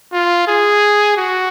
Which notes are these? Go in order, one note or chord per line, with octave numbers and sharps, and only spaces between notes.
F4
G#4
F#4